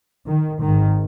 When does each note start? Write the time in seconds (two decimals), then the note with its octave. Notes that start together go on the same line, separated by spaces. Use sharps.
0.26 D#3
0.60 G#1 G#2 D#3